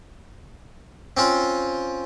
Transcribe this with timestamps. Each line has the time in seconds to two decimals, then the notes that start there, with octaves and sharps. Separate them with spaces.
1.17 C4 C#4 F4